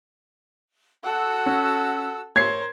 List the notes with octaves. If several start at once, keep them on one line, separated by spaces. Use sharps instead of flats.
F#4 A4 F#5 E6
C#4
A#4 C5 C#5 G#6 C7